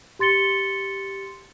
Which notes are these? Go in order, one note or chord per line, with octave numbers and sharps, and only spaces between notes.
G4 C6 A6 C#7 G7